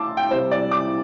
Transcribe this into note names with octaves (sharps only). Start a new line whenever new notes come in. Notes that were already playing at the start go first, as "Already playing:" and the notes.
Already playing: A3 A5 C6 D6 E6
G5
C3 G3 C5
D5
D6